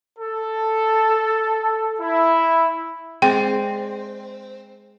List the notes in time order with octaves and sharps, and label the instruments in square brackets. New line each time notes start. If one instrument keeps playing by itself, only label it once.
[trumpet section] A4
E4
[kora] G#3 D5 [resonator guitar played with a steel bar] C4 [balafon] G5